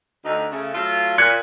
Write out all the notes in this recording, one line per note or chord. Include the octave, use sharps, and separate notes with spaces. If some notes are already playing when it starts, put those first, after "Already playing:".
D2 D#4
C#3 A3
F#3 A3 F4
A#2 F#6 G#6 C#7